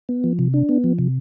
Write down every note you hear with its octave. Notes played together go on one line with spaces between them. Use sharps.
B3
F3
C3
D4
B3
F3
C3